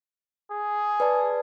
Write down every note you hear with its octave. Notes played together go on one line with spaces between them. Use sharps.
G#4
B4 D5 A5